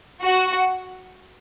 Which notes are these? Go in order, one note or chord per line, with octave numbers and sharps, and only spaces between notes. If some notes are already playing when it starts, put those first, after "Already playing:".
F#4 F#5